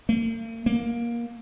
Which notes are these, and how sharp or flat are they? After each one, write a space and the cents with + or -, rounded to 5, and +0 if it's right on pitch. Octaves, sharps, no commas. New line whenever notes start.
A#3 -45
A#3 +15